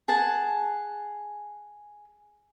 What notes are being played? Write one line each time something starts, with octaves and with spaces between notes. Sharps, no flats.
G#4 F#5 A5